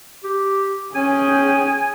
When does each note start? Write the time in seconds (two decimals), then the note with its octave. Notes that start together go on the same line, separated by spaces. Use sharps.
0.24 G4
0.95 C#4 G#4 G5 G#5